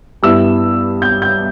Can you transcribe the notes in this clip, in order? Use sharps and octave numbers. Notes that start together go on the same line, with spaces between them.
G2 G3 B3 E4 E6
G6
G6